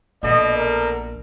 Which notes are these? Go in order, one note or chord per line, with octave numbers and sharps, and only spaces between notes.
A#1 B2 A3 D5 D#5
A#4